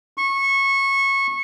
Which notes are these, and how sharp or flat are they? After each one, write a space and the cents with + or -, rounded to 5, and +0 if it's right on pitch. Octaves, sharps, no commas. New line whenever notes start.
C#6 -20